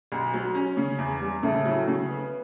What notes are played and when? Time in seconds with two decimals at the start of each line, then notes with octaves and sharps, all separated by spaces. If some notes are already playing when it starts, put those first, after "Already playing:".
0.12 B1
0.34 F#3
0.54 C#4
0.77 C#3
0.98 E2
1.21 G3
1.43 A2 C#3 A3
1.65 F#3
1.88 C#3
2.09 B3